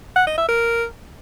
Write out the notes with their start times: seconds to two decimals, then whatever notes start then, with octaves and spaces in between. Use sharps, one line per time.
0.16 F#5
0.27 D#5
0.38 E5
0.49 A#4